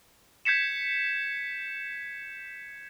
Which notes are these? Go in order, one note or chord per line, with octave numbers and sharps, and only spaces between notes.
G6 G#6 B6 C#7 E7